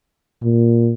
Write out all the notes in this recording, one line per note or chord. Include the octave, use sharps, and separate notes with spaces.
A#2